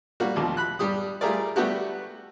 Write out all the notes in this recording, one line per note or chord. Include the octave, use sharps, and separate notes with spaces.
G3 A#3 F#4
A#1 D#2 B2 F3
B5 F#6
G2 G3 G4 D#6
G3 A3 F4 G#4 A#4 D5
G3 A3 B3 F#4 G4